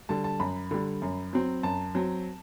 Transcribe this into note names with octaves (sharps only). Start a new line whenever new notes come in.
D3 G3 A5
A5
F#2 B5
D3 G3
F#2
F#3 C4
F#2 A5
F#3 C4